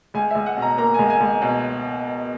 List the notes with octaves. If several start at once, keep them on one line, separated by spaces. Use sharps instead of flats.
C#2 G#5
C#2 E5
F#5
B2
A#5
A#3 A#5
C#2 G#5
G#5
C#2
B2